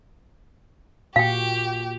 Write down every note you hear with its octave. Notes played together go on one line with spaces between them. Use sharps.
A#2 F#4 G4 F5 G5